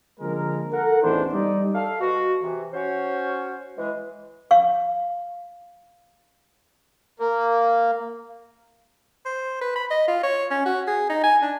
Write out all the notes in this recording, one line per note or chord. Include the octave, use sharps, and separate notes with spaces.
D3 F3 G#3 A#3 A#4
A4 A#4 F#5
A1 E2 D#3 E3 D4 C5
G3 D#4 D5
A4 F5
B2 F#4
C3 E3
C#4 F#4 C5 C#5
E3 G#3
F5 C#6
A#3
C5
B4
B5
D#5
F4
C#5
C#4
F#4
G#4
D#4
G#5
D4